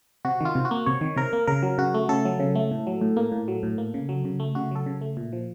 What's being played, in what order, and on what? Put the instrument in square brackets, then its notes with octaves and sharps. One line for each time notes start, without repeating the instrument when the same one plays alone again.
[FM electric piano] C3 F#4
D#3 F4
C3
F#4
A#3
C3 C#5
D#3
C3 A#4
A#3
C#3 A#4
F#3
C#3 F#4
A3
C#3 A4
F#3
C#3
A3
A2
F#3
A2
A#3
A2
F#3
A2
A#3
C#3
F#3
C#3
A3
C#3 F#4
F#3 A4
C#3
A3
A#2
F3